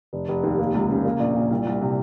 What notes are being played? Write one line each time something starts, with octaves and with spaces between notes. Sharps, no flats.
F1
F1
D#2
A#3
C#2
C#3
A#3
A#1
A#2
C2
C2
C3